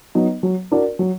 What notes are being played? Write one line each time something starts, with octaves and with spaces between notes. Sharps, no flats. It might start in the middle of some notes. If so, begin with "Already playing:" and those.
F#3 B3 D#4
F#3
D4 F#4 A#4 D5
F#3